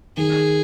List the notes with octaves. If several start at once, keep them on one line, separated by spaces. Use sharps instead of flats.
D#3 G#4